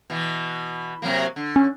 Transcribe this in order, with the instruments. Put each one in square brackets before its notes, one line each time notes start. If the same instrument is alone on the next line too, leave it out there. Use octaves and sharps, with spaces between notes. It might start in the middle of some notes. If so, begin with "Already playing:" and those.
[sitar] B2 E3
C3 F#3 A#3
D3
[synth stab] C#4